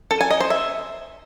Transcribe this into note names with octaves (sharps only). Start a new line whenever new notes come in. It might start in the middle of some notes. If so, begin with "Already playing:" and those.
A4
G#5
D#5
C5
E5